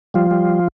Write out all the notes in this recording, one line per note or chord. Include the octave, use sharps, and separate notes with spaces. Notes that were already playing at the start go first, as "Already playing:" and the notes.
F3 G3 F4
G3